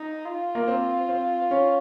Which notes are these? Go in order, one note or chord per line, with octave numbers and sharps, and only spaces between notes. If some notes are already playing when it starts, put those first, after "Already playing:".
Already playing: D#4
F4
A#3
C4
C4
C#4